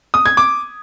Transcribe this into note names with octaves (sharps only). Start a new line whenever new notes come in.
D#6
G#6
D6